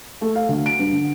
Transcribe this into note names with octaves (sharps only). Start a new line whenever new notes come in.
A3
F5
D2
D7
G2
D3